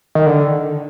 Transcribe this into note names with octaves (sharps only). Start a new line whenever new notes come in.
D#3
D3